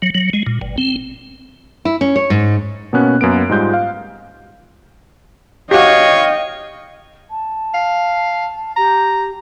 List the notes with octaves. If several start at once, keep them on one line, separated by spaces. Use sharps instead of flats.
F#3
F#3
G#3
A#2
G1
C4
E4
C#4
C#5
G#2
B2 A#3 B3 C#4 F#6
F#2 A#3 B3 D7
G#2 G3 G#3 F4 G6
F5
F#4 G4 C#5 D#5 F5 G5
A5
F5
G4 A#5